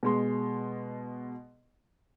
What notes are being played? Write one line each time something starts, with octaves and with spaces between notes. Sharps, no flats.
B2 G#3 C6